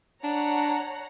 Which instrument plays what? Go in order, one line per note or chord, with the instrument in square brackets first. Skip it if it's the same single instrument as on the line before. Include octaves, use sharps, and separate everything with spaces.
[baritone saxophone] D4 [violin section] C#5 F#5 A#5